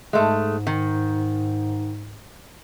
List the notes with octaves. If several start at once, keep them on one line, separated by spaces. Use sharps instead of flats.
G#2 G#3 A3
D#3